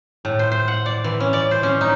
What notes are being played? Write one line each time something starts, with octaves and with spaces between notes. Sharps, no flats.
A2
C5
C5
F#5
D5
E3
C#4
D5
C5
C#4
D#4